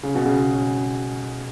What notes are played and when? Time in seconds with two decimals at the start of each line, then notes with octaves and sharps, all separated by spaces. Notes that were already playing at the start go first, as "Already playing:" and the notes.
0.03 C#3
0.15 B2
0.26 C#3